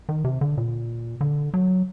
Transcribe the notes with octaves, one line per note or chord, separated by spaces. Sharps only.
D#3
C3
D3
A#2
D3
F#3